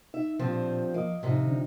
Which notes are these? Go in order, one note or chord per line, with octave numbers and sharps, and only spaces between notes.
D#4 E5
G2 A#2 F3 C4
F3 A#3 D#5 D#6
A2 C3 F3 D#4
D3 D4